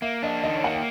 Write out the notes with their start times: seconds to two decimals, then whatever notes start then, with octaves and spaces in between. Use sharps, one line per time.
0.02 A#3 E5
0.23 D4 D#5
0.44 D#3 D#5
0.54 C#5
0.64 A#3 F#5
0.74 G5